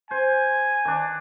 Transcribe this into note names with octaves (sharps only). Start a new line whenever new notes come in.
C5 G#5
D#3 D4